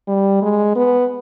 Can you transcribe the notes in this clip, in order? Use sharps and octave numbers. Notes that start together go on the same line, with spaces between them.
G3
G#3
B3